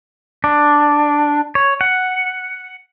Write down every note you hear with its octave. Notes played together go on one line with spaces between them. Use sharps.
D4
C#5
F#5